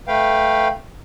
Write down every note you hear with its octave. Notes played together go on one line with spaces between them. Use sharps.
A3 B4 F5 G5